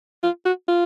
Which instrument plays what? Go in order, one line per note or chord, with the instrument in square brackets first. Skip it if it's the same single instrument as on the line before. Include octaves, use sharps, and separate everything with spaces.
[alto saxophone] F4
F#4
F4